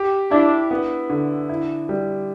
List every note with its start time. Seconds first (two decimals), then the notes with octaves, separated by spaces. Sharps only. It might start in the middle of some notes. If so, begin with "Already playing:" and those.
Already playing: G4
0.31 D4 E4
0.71 B3
1.10 D3
1.49 E4
1.89 G3